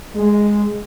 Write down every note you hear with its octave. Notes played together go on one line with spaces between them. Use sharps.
G#3